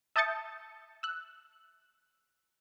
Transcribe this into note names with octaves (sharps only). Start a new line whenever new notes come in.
E5 A5 D#6 G6 A6 C#7
E6 F#6